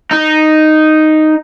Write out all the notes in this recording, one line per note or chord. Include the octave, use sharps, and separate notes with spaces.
D#4